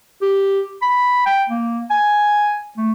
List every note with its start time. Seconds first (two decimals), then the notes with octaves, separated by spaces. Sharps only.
0.22 G4
0.82 B5
1.26 G5
1.49 A#3
1.90 G#5
2.77 A3